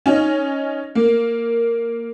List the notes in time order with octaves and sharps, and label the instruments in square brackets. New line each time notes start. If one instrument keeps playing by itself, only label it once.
[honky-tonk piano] C#4 D#4
A#3